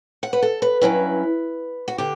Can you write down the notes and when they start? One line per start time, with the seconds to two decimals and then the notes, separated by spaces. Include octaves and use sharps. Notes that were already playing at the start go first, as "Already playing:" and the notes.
0.23 F#5
0.33 B4
0.42 A4
0.62 B4
0.81 G2 F#3 C#4 E4 B4
1.88 F#4
1.98 D3 G4